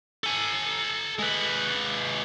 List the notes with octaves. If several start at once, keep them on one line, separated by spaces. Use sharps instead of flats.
A4 G#5
G#3 B4